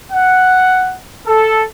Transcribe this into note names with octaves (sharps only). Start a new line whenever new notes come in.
F#5
A4